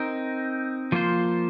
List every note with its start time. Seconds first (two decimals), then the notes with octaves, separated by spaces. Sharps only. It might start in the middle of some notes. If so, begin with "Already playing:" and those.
Already playing: C4 D#4 A#4
0.92 F3 A#3 F4 C5